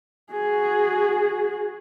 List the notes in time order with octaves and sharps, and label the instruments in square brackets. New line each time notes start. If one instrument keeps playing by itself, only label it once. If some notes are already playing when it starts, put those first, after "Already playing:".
[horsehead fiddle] F#4 G#4